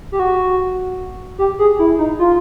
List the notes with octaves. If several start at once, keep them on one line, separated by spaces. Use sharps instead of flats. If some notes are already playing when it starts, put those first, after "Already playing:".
G4
F#4
G4
G#4
E4
D#4
F4